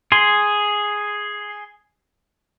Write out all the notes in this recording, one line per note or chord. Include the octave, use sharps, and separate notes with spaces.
G#4 C6